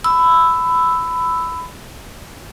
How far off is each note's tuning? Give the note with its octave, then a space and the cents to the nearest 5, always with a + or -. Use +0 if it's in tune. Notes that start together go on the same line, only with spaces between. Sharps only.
B5 +20 E6 +0